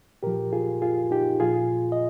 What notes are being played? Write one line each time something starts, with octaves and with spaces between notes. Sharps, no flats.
A#2 F3 G4 A#4
F4 G#4
F4 G#4
D#4 G4
A#2 F3 F4 G#4
D#5